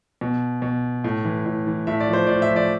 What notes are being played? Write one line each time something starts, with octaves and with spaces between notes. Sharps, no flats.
B2
B2
A2
E3
A2
E3
A2 E5
D5
F3
C5
A2 D5
E5
F3
D5